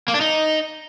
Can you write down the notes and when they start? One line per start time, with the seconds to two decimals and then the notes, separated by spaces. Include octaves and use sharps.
0.08 A#3
0.14 D4
0.21 D#4